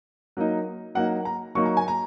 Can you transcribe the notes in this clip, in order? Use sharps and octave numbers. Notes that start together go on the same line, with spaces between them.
F#3 A#3 D#4
F#3 A#3 D#4 F#5
A#5
F#3 A#3 D#4 C#6
A#5
G#5
A#5